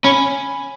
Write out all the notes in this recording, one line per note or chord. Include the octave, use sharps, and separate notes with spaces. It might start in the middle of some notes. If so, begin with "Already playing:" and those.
C#4 G#5 B5